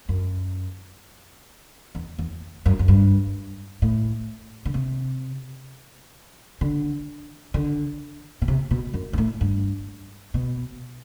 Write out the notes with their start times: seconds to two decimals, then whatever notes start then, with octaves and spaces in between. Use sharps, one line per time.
0.09 F#2
1.95 E2
2.19 E2
2.66 F#2
2.79 F#2
2.88 G2
3.82 A2
4.65 D3
4.74 C3
6.61 D3
7.54 D3
8.42 B2
8.48 C3
8.71 B2
8.94 F#2
9.13 G2
9.18 A2
9.41 G2
10.34 B2